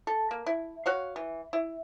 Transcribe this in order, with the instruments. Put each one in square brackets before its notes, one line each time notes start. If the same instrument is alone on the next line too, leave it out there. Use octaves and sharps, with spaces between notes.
[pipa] A4
A#3
E4
F#4 C#5 F5
E3
E4